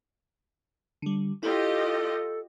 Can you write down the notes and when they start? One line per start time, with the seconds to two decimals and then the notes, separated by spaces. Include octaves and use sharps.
1.02 D3 G3
1.43 E4 F4 G4 A4 D#5